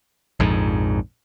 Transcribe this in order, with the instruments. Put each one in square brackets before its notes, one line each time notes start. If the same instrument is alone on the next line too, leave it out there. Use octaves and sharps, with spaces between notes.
[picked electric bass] A#1 F2 G#2